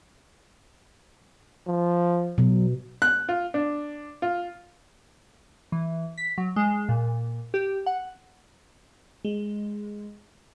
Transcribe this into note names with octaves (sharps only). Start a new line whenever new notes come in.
F3
B2 F#3
F#6
F4
D4
F4
E3
B6
F#3
G#3
A#2
G4
F#5
G#3